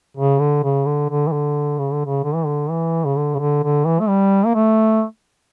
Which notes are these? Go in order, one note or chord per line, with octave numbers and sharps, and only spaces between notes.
C#3
D3
C#3
D3
D3
E3
D3
C#3
D3
C#3
D3
E3
D3
E3
C#3
D3
C#3
D3
D3
E3
A3
G3
A#3
A3